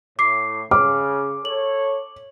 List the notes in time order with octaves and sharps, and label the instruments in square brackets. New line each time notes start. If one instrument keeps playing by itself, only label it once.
[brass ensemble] A2 [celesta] D6 C7
[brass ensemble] C#3 [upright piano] D6 [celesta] F6
[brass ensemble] A4 C#5 [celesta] F#7